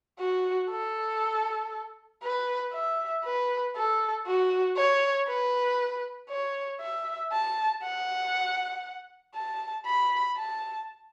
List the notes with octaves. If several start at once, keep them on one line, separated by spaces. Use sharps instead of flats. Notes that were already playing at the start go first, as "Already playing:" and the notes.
F#4
A4
B4
E5
B4
A4
F#4
C#5
B4
C#5
E5
A5
F#5
A5
B5
A5